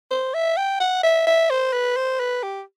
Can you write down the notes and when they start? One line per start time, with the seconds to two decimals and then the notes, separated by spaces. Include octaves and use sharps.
0.11 C5
0.34 E5
0.57 G5
0.80 F#5
1.03 E5
1.27 E5
1.50 C5
1.73 B4
1.97 C5
2.20 B4
2.43 G4